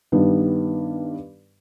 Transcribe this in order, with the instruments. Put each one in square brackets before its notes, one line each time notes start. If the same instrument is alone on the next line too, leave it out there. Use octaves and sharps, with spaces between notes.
[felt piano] G2 D#3 G3 B3